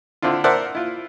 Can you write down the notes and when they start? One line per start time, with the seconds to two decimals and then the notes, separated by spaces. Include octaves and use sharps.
0.22 D3 C4 D4 E4 F4
0.44 A#4 C5 D5 E5 F#5 A5
0.75 E4 F4